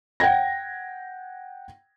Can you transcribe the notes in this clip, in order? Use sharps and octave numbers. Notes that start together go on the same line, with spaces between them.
F#5 G5 G#6 A#6